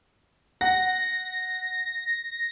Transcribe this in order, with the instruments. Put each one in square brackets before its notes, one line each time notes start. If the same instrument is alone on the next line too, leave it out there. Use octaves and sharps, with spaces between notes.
[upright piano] F#5 [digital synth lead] A#6